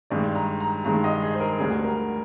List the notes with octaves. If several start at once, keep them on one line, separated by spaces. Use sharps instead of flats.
G2 D#3 G#3 D5
A#5
A#5
G2 D#3 G#3 A#5
D#5
G#4
C5
A#4
D2 D3 G3 G#4
A#4